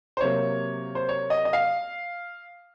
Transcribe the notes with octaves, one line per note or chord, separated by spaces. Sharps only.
C5
C3 F#3 A#3 C#5
C5
C#5
D#5
D#5
F5